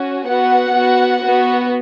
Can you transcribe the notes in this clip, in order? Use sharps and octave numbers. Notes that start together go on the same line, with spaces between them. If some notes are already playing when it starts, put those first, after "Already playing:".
Already playing: C#4 F#4
B3 F#4 F#5
B3 F#4
B3 F#4